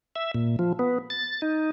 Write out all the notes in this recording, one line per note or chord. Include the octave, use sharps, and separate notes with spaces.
E5
A#2
F3
B3
A6
D#4